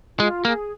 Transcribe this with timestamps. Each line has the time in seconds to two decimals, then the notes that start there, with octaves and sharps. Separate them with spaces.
0.19 G#3 F4
0.45 A#3 G#4